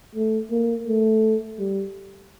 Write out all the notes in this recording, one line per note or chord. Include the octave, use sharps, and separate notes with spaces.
A3
A#3
A3
G3